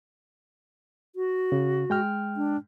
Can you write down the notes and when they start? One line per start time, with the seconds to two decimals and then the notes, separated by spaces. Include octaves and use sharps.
1.16 F#4
1.52 C#3
1.90 G#3 G5 F6
2.37 D4